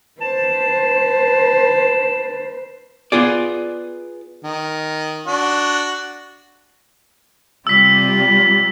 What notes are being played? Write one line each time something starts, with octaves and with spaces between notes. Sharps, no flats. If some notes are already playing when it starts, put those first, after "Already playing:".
B4 C5 A5
B3 F4 G#4 D5
D#3
D4 F#4
C3 G3 F4 G4 E6 B6